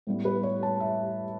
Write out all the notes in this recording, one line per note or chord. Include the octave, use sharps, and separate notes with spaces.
A2 G3 B3
B4
C#5
A5
E5